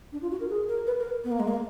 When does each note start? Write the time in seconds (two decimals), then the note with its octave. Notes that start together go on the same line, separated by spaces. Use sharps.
0.12 D4
0.22 F4
0.31 F#4
0.40 A#4
0.49 G#4
0.68 A#4
0.87 B4
0.99 A#4
1.24 B3
1.32 A#3
1.40 G#3
1.48 A#3